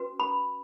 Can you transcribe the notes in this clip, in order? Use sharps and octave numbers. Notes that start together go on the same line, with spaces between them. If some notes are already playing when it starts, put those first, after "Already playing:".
Already playing: C#4 F#4 B4
B5